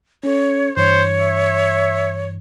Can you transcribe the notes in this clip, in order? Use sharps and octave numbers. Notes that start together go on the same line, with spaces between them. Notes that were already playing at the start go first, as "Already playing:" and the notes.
C#4 A4 C#5
G2 E3 C5 C#5
E5